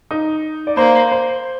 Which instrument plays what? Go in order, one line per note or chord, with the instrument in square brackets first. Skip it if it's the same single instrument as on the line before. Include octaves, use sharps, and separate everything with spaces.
[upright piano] D#4
D5
[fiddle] A#3 [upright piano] C5
[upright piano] C5